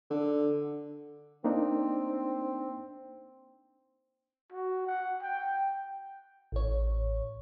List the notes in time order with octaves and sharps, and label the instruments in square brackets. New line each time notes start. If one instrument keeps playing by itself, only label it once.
[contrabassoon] D3
[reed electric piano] A#3 D4 D#4 [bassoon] C4
[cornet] F#4
F#5
G5
[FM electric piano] A1 C#5